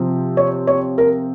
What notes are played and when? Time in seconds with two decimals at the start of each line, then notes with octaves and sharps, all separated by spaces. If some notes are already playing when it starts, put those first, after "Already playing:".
Already playing: C3 F3 C4
0.37 C#5
0.67 C#5
0.98 A#4